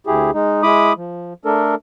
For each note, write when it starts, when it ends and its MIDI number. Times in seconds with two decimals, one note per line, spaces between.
0.07 0.31 38
0.07 0.31 64
0.07 0.31 67
0.07 0.31 68
0.34 0.63 56
0.34 0.63 63
0.63 0.93 56
0.63 0.93 64
0.63 0.93 83
0.63 0.93 86
0.63 0.93 87
0.97 1.33 53
1.45 1.75 57
1.45 1.75 62
1.45 1.75 69
1.45 1.75 70